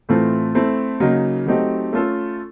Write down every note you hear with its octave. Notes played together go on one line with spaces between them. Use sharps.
A2 E3 A3 C4 F4
A3 C4 E4
C#3 F#3 A#3 D#4
F#3 A3 C4 D#4 G4
A3 C#4 F4 A4